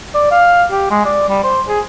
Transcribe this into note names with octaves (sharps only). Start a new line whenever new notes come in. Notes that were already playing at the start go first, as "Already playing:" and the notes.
D5
F5
G4
G#3
D5
G3
C5
G#4